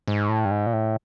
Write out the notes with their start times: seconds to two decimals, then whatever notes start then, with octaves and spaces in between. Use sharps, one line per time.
0.08 G#2
0.29 A2
0.45 G2
0.51 G#2
0.66 A#2
0.73 A2